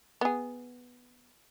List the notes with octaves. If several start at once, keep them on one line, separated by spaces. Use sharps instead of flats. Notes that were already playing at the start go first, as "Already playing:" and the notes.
B3 G#4